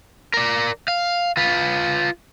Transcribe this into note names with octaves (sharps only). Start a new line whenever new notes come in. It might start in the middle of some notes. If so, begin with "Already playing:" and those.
A#4 D5
F5
F4 B4